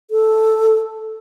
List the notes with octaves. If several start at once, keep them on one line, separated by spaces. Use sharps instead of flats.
A4